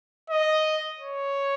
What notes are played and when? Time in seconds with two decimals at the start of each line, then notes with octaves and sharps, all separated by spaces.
0.30 D#5
0.98 C#5